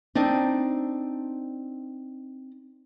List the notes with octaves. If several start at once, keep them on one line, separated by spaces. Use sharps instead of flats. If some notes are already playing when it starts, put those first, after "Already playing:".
C4 D4 D#4